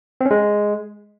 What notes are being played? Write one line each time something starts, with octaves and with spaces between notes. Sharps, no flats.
C4
C#4
G#3